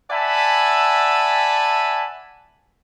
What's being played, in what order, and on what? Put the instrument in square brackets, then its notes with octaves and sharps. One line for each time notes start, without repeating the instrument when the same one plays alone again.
[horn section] D5 E5 F#5 G#5 A5 B5